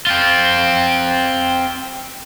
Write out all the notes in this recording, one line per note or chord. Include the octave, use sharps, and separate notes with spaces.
C4 F4